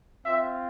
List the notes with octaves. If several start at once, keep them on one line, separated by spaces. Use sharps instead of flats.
C4 F4 E5